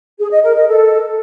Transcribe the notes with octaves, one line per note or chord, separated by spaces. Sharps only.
G#4
D#5
A#4
D#5
A4